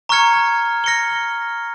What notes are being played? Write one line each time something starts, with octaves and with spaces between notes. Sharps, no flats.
A#5 C#6 F6 G#6 C#7
F6 A#6 C#7 G7